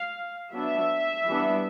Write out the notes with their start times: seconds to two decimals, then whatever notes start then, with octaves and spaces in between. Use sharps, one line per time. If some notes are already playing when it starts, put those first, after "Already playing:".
Already playing: F5
0.53 F#3 B3 D4 E5
1.28 E3 G3 B3 D4